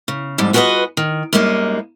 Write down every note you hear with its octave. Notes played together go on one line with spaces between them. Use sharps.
C#3
F2 G#2 G3
F4 F#4 G#4 A4 B4 D#5
D#3
F#2 G3 G#3 A#3 D4 D#4